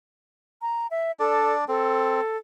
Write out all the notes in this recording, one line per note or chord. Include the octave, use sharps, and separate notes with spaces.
A#5
E5
D4 A4 D5
C4 A4